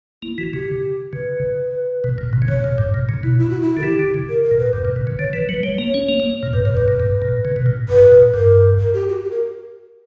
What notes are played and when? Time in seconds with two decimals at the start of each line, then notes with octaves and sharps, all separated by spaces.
0.23 A#3 E4
0.38 E3 F#4
0.53 C#3 G4
1.13 C#3 B4
2.04 B2
2.18 A#2
2.33 B2
2.42 C#3
2.48 B2 C#5
2.64 A#2
2.78 G2
2.94 A#2
3.09 C#3
3.23 B2 E4
3.39 E4
3.50 F#4
3.61 E4
3.77 D3
3.79 A#4
3.83 E3 G4
3.99 D3
4.14 C#3
4.29 A#4
4.43 A#4
4.51 A#2
4.59 B4
4.73 G2 B4
4.85 A#2
4.96 B2
5.07 C#3
5.19 D3 C#5
5.33 E3 B4
5.49 F#3 B4
5.63 G3 C#5
5.78 A#3
5.84 C#5
5.94 C#4
6.09 A#3
6.20 A#3
6.43 A#2
6.53 G2 B4
6.64 A#2 C#5
6.73 G2 B4
6.88 A#2
7.00 G2
7.22 A#2
7.45 C#3
7.56 B2
7.66 A#2
7.89 G2 B4
8.12 A#2
8.34 G2 A#4
8.79 A#4
8.94 G4
9.09 F#4
9.24 G4
9.31 A#4